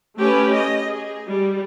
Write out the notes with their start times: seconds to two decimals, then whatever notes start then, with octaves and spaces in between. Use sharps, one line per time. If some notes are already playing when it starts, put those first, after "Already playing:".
0.17 A3 C#4 G4 B4
0.52 D#5
0.86 G#4
1.28 G3